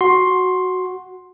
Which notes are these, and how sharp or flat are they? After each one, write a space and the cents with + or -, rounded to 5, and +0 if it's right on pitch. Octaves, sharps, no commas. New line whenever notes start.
F#4 +0 C6 +10